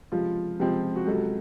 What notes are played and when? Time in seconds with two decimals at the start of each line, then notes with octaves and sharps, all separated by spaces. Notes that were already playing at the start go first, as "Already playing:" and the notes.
0.12 C#2 C3 F3 F4
0.59 C#2 C3 F3 C4
0.96 F#4
1.06 C#2 C3 F#3 A4